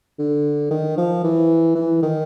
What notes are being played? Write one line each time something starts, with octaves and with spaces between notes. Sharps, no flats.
D3
D#3
F3
E3
E3
D#3